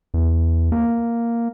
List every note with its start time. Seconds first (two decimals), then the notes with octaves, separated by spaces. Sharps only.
0.14 E2
0.72 A#3